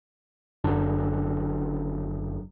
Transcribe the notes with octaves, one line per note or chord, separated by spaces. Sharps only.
F#1 F#2 D3 D4